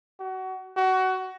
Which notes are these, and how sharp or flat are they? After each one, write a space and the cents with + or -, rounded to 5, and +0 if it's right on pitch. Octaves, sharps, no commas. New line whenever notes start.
F#4 +25
F#4 +20